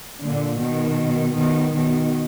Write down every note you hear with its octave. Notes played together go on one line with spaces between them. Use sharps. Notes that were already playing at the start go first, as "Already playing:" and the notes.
A#2 D3
B2 D#3
B2 D#3
B2 D#3